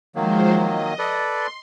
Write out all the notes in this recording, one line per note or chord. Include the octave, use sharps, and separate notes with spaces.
D#3 F3 F#3 G#3 A#3 C5
D#5
A4 B4 D5
C6